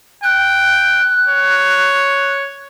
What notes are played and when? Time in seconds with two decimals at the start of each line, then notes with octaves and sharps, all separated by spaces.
0.24 G5 F#6
1.28 C#5